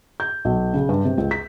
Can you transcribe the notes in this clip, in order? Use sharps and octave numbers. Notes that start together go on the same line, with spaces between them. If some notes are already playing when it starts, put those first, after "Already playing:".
G6
B1
C#3
G2
C3
C#2
B6